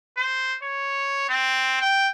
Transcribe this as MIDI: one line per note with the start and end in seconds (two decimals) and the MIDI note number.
0.17 0.56 72
0.62 1.24 73
1.29 1.79 60
1.81 2.08 79